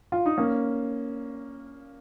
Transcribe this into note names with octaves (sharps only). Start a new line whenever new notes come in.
F4
D#4
A#3 C#4